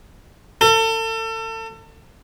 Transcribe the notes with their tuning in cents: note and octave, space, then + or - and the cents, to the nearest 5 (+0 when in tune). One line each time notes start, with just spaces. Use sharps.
A4 +35